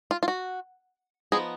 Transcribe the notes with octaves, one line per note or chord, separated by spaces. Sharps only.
F4
F4
F#4
F3 B3 D#4 G#4